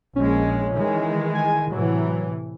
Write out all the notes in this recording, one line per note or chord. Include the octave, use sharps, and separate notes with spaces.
A#1 G#3 C#4
D#3 E3 G#3
G#5
A2 C3 E3 F#3